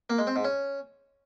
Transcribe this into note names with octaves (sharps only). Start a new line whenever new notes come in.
A#3
G#3
C4
G#2
C#4